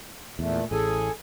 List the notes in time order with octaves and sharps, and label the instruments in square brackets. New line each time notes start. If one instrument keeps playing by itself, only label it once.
[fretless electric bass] E2 [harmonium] A#2 A3
[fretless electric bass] A1 A2 [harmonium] G#4 A4 G#5